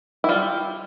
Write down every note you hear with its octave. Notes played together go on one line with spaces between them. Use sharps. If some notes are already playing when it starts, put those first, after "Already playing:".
E4
G3 F4